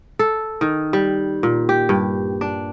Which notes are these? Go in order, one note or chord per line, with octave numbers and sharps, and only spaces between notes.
A4
D#3
G3
A#2
G4
G2
D4